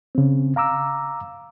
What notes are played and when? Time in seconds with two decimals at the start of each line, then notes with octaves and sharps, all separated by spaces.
0.15 C#3 C4
0.56 F5 A#5 D6 E6